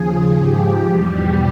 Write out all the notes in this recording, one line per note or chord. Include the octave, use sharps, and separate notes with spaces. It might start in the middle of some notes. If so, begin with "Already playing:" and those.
Already playing: D#2 C#3 F3 G#4
G#2 F3 G4
E2 B2 G3